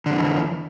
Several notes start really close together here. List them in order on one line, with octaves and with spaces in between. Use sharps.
D3 F2 E3